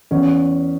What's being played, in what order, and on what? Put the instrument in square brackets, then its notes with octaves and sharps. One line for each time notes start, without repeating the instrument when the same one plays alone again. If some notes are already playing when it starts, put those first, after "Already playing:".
[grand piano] E2 C#4